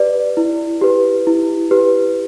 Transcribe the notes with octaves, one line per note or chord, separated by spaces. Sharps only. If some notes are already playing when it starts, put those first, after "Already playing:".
Already playing: G4 B4 D5
E4
G4 B4
E4
G4 B4